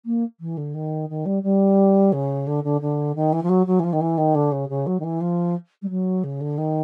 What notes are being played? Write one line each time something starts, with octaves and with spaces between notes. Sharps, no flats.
A#3
E3
D3
D#3
D#3
G3
G3
C#3
D3
D3
D3
D#3
E3
F3
F#3
F#3
E3
F3
D#3
E3
D#3
D3
C#3
C#3
F#3
D#3
E3
F3
G3
F#3
C#3
D3
D#3